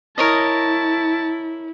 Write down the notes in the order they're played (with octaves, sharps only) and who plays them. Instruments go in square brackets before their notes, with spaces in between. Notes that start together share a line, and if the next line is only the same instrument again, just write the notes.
[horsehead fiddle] E4 [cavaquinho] A#4 C#5 D#5 [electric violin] A5